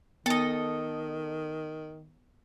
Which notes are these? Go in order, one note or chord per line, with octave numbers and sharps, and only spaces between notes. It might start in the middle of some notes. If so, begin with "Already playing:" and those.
D#3 B3 A4 D#5